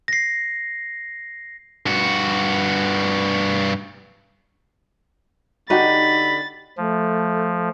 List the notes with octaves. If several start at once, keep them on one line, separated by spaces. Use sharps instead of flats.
A#6 C7
G2 F#4
D3 D#4 F#4 G4 F#5 B5 A6
F3 A3